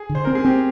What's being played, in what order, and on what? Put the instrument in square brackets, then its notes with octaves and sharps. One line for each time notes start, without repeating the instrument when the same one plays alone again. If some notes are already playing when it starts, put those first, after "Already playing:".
Already playing: [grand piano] G#4
[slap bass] D3
[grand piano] C5
[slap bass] C4 [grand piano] A#4
[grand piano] G#4
[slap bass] C4 [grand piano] G4